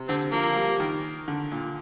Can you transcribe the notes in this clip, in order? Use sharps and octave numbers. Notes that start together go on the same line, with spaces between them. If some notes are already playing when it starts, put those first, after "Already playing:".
Already playing: C3
D3 C4
F3 A#3
G3
D#3
D3
A#2